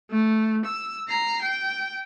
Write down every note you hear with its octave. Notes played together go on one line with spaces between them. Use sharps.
A3
E6
A#5 C7
G5